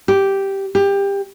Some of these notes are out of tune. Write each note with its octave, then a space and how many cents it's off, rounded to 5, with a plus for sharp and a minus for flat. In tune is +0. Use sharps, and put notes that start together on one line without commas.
G4 -5
G4 +20